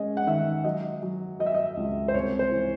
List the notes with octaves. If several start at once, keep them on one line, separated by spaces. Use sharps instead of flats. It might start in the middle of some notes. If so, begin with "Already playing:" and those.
Already playing: G#3 C#4 D#5
F#5
D#3 E5
F#3 D#5
F#3
F#3 D#5
E5
D#5
C#2
C5
C2 C#5
C5
E3